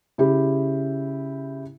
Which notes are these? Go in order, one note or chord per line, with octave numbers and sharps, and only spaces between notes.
C#3 E4 G4